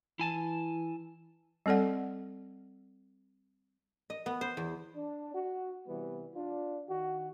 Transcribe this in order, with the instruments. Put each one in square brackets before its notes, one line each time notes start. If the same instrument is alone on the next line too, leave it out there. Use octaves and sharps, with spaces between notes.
[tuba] E3 [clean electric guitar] E4 G#5 A5
[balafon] G3 C4 A4 D5 F#5
[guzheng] D#5
B3
C5
E2
[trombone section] D4
F#4
C3 E3 G3 B3
D4 F4
D#3 F#4